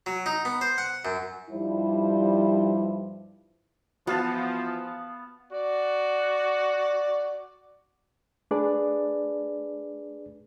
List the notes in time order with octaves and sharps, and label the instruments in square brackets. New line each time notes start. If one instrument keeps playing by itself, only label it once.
[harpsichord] F#3
D#4
B3
C5
F#5
F#2
[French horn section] G2 F3 G3 D#4 E4 C5
[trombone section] E3 F3 [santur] B3 F5 A5 [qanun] F#4
[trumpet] F#4 [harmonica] D5
[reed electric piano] A3 D4 G#4 B4 D5